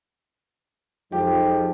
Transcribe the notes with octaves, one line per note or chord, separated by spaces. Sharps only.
F2 F3 F#3 G#3 D#4 G4